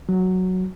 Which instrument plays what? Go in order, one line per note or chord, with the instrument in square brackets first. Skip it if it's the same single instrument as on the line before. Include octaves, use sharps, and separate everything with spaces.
[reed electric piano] F#3